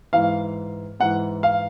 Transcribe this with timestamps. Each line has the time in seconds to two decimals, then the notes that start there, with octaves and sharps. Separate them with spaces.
0.13 G#2 E3 F5
1.00 G#2 E3 F#5
1.43 F5